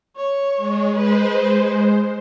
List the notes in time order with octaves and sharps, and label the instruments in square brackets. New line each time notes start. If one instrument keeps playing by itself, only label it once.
[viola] C#5
[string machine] G#3
[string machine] G#3 C5 [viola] B4